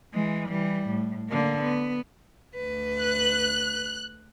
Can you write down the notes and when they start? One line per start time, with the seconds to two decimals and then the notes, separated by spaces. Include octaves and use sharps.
0.14 E3 G#3
0.48 E3 G3
0.88 A2
1.29 D3 A#3
1.62 B3
2.55 D2 B4
3.00 F#6